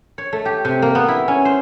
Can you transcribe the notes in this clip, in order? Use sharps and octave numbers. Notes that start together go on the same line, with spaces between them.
C#5
A3
G4
C3
A#3
B3
E4
C#4
C5